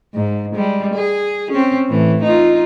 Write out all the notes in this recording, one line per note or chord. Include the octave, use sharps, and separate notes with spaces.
G#2
G3 G#3
G#4
C4 C#4
A2 E3
D#4 F4